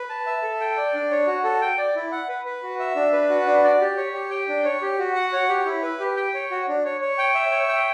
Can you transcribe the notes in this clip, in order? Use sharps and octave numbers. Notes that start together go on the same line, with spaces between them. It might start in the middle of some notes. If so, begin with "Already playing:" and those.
Already playing: B4
A5
E5
A4
G5
D5
D4
C#5
F#4
A4
G5
D5
E4
F#5
B4
B4
F#4
E5
D4
B4
F#4
D4
D5
G4
C#5
G4
G5
D4
C#5
G4
F#4
F#5
C#5
G4
E4
B4
G4
G5
C#5
F#4
D4
C#5
C#5
G5
E5
C#5
G5